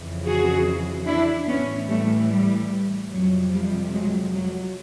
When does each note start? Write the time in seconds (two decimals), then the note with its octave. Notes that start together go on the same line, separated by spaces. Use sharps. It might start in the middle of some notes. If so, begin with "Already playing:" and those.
Already playing: F2 C#3 E3
0.25 F#4 G#4
1.07 D4 E4
1.47 A2 E3 B3 C#4
1.88 G3 A3
2.29 G3
3.10 F2 C3 F3 F#3
3.52 G3
3.92 F#3 G#3
4.32 F#3